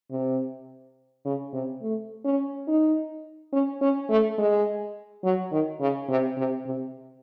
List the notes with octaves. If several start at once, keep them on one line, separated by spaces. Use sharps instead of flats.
C3
C#3
C3
A3
C#4
D#4
C#4
C#4
A3
G#3
F#3
D#3
C#3
C3
C3
C3